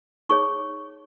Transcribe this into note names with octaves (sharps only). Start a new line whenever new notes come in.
D#4 G#4 C#5 C#6